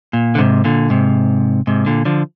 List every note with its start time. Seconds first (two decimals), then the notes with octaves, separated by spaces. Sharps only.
0.13 A#2
0.35 D3
0.38 G#2 C3
0.64 A#2 D3
0.90 G#2 C3
1.67 G#2 C3
1.86 A#2 D3
2.05 D3 F3